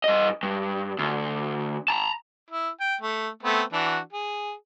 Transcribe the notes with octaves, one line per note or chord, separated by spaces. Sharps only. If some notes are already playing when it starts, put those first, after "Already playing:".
G2 D#5
G2
D2
A5 A#5
E4
G5
A3
A3 B3 C4
E3 D4 F#4
G#4